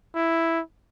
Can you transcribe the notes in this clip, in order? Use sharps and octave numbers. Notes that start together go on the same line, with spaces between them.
E4